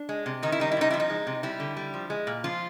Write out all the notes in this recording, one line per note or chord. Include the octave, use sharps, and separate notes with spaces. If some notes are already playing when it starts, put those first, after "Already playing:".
Already playing: D4
G#3
C3
D#3 D#4
E4
G3 D#4
E4
C3 D#4
F3 E4
D#4
G#3
C3
G3 E4
D3
G3
F3
G#3
A#2
F3 F4